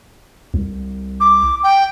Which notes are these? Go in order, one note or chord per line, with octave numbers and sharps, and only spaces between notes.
C2
D6
G5